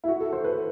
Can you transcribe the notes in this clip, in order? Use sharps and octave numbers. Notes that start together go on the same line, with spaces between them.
E4
F#4
A4
C5
B4